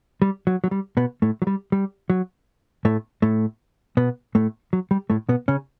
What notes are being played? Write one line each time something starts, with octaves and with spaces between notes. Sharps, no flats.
G3
F#3
F#3
G3
B2 B3
A2 A3
F#3
G3
G3
F#3
A2 A3
A2 A3
B2 B3
A2 A3
F#3
G3
A2 A3
B2 B3
C#3 C#4